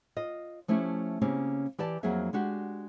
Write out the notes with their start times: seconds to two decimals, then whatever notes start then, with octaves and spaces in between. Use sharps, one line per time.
0.17 F4 D#5
0.68 F3 A3 C#4 E4 G4
1.21 C#3 A#3 C4 C#4 G4
1.78 E3 G4 D5 A5
2.03 F2 F#3 A#3 D#4 G#4 E5
2.33 G#3 D4 F#4 G4